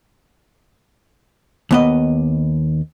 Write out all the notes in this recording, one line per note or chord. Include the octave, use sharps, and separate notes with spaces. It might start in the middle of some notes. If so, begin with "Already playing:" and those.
D#2 B3 D#5